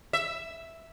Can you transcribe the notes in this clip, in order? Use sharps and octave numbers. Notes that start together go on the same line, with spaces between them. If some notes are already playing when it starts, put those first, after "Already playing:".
E5